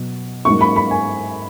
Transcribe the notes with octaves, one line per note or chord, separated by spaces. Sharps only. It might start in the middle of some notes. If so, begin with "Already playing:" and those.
Already playing: B2 F#3
G#2 F#3 A#3 C#6
B5
B5
G#5